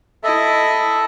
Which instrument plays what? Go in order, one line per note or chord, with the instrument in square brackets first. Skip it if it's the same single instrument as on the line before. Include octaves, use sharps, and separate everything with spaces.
[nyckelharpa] E4 D#5 [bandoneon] A4 E5